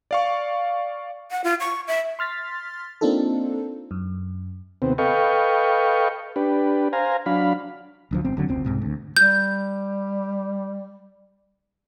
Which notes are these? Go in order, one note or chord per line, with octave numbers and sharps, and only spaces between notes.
D5 F5 C#6
F#5
F4
C#6
E5
C6 F6 A6 B6
A#3 C4 D4 D#4 F4 A4
F#2
D#2 C3 B3 C4
A4 B4 D#5 F5 G5 C#6
D4 G4 B4
C5 F5 G#5 A#5
F#3 D4 F5 B5
D1 D2 F3
G1 C4
F1 D3 F#3
F1 C#2 C4
C2 G#2 C3
D2
G3 G6